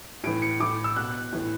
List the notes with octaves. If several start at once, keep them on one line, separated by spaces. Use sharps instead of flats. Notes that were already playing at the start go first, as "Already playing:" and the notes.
A2 E3 D7
C#7
A2 E3 D6
E6
B2 F#6
A2 E3